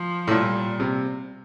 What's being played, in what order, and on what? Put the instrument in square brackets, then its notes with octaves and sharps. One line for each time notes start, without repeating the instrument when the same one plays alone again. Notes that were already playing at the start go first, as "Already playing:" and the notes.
Already playing: [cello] F3
[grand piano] A2
[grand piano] A#2 [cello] G3
[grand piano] C3